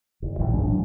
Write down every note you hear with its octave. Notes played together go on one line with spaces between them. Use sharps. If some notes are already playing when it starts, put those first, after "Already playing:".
F#1
A#1 G2 E3
G1 C#2 G#3 D4
A2 E3 F#3